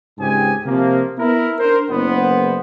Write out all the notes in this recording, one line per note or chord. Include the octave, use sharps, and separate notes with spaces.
C#2 G#2 C4 G4 G#4 G#5
C3 F3 A#3
B3 E4 A#4
D4 A#4 C5
F#1 B3 C5